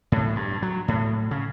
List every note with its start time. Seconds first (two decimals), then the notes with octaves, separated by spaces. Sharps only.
0.12 A2
0.35 G2
0.62 F#3
0.88 A2
1.31 C#3